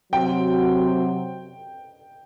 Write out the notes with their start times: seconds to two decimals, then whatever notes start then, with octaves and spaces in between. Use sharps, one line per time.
0.13 C3 F#3 C4 F#4 G5